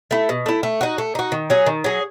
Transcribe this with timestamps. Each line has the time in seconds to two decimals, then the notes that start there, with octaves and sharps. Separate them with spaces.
0.11 A3 E4
0.29 B2
0.46 A3 E4
0.63 A3
0.81 D#4 F#4
0.98 A3
1.15 D#4 F#4
1.32 D#3
1.50 F#3 C#4 G#4
1.66 D#3
1.84 F#3 C#4 G#4